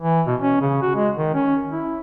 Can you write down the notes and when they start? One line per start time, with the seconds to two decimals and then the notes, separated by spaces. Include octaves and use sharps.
0.02 E3
0.27 B2
0.40 C#4
0.62 C#3
0.82 F#4
0.96 G#3
1.17 D#3
1.34 C#4
1.70 E4